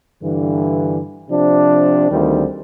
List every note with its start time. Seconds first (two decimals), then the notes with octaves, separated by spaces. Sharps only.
0.21 G2 D3 E3
1.30 C3 F3 D4
2.10 D2 D#3 G3 C4